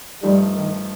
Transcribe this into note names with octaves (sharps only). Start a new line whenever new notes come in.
G2 F3 G3 A3 D#4
D#3